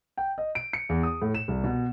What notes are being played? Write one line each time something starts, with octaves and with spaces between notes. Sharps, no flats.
G5
D#5
D7
C#7
E2
D#6
A2
E7
C2
B2